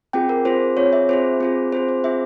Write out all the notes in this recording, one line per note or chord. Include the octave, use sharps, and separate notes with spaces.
C4 F4 G#4 G5
A#4
C4 F4 G#4 C5
C4 F4 G#4 C#5
E5
C4 F4 G#4 C5
C4 F4 G#4
C4 F4 G#4 C5
C5
C4 F4 G#4 E5